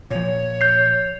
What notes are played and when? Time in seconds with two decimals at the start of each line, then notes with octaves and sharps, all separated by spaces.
0.11 A#2 F3 C#5
0.61 G6 C7